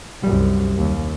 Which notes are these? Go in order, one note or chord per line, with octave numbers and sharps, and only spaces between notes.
C2 F#2 G3
D#2